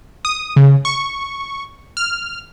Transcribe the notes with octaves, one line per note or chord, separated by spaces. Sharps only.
D#6
C#3
C#6
F6